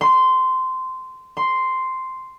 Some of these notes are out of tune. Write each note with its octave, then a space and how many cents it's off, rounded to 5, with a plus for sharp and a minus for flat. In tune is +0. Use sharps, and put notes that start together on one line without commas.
C6 -15
C6 -5